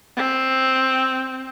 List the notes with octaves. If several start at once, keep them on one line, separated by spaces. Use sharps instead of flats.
C4